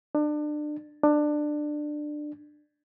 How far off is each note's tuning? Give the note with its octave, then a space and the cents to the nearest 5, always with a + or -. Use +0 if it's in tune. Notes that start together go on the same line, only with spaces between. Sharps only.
D4 +30
D4 +20